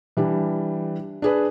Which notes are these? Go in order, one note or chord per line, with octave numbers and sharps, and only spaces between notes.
E3 G3 D4
D4 G#4 B4